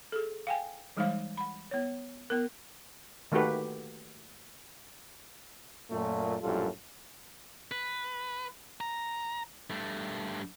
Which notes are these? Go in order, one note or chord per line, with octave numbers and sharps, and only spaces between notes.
G#4 A4
F5 G5 G#5
E3 G3 G#3 D#4 C5 F5
F#5 B5
B3 C#5
B3 A#4
D#3 A3 A#3 F#4 G4 B4
F#2 A#2 A3
A#1 F#2 A2 G3 F4 A4
B4
A#5
G2 A3